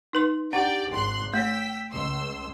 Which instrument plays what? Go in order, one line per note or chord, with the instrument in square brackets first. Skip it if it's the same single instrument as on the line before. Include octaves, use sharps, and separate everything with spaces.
[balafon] D#4 B4 C6
[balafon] D4 F#5 [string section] G4 D5 G5
[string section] G#1 C6 F#6
[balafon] A3 C#5 [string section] G5 E6 B6
[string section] C#2 C6 E6